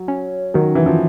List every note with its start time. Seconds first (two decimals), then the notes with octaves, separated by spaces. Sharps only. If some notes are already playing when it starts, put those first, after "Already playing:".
Already playing: F#3
0.08 C#4
0.54 D#3 F#3
0.75 E3
0.86 F3